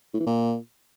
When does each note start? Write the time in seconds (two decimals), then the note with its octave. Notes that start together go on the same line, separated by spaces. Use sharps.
0.14 A2
0.20 E3
0.27 A#2